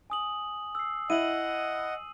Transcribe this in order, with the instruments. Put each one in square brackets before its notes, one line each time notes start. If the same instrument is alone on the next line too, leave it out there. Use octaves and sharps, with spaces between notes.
[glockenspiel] G#5 D#6 F#7
E6 C7
[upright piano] E4 [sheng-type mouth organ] D#5 F#5 [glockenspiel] D#7 F#7